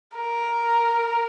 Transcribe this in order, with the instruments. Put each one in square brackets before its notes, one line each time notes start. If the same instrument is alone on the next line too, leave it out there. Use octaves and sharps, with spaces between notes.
[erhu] A#4